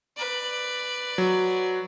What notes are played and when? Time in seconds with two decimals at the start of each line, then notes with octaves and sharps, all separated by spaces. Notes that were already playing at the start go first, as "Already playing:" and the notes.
0.17 B4 D5
1.18 F#3